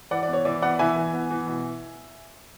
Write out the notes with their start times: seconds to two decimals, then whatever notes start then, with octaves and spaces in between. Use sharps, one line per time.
0.11 E3 D5 F#5
0.23 D5
0.28 B3 C#5
0.45 E3 D5
0.62 B3 D5 F#5
0.79 E3 E5 G#5
0.96 E3
1.13 B3
1.30 E3
1.47 B2